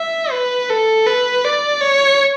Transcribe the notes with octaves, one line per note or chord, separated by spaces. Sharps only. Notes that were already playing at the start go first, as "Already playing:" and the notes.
Already playing: E5
B4
A4
B4
D5
C#5